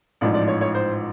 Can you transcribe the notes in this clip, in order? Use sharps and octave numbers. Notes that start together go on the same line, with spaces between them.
A1 G#2 F3 D5
D5
C#5
C#5
C5